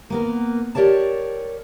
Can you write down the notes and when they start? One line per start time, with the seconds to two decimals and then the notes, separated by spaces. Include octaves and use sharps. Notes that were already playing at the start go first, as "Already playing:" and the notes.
0.10 A#3 B3 A#4
0.75 G4 A#4 C#5 D5 A5